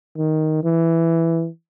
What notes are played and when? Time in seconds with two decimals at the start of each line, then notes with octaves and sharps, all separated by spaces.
0.17 D#3
0.64 E3